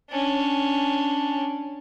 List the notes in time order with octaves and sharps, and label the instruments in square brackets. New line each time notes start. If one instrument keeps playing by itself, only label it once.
[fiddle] C#4 D4